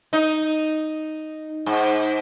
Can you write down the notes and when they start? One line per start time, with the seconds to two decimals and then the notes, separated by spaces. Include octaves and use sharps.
0.13 D#4
1.66 G#2